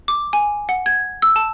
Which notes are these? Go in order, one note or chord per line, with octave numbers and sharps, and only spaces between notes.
D6
G#5
F#5
G#6
E6
A5